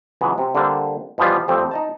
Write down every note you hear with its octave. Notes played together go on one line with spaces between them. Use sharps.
C#2 E3 F#3 G#3 B3
C3
D3 G3 A#3 D4 A4 C5
B2 E3 F3 G3 F4
F2 G3 A3 C4
D#4 D#5 A5